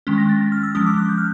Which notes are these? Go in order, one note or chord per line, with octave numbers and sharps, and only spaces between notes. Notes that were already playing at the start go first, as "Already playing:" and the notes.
D#3 G#3 C#4
A#6
A6
A6
F6
E6
F3 G#3 C#4 D#6
D6
F#6
G6
F6